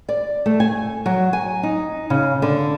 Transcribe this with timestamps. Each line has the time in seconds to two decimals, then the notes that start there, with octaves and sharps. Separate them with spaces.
0.09 D5
0.46 A3
0.60 G#5
1.06 F#3
1.33 G#5
1.63 D#4
2.10 C#3
2.42 D3